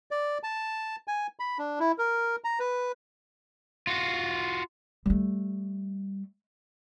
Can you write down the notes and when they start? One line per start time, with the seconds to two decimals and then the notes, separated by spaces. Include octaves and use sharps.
0.11 D5
0.43 A5
1.08 G#5
1.39 B5
1.59 D4
1.80 E4
1.98 A#4
2.44 A#5
2.60 B4
3.87 F4 F#4
5.06 G3 A3